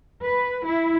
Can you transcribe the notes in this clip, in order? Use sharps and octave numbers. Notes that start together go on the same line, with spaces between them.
B4
E4